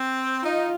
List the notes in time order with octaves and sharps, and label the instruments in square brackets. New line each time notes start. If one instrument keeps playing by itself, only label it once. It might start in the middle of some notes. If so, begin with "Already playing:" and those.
Already playing: [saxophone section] C4
[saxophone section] D#4 [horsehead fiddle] F4